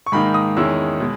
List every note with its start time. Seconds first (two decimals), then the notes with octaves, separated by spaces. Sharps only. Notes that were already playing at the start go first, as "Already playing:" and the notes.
0.06 C#6
0.12 G#2 D#3 A#3 D#4 B5
0.34 D#6
0.57 E2 D#3 G#3 C#4 E4 E6
1.00 B2 G#3